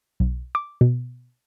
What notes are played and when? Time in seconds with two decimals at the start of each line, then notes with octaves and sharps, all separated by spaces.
0.20 B1
0.55 D6
0.81 B2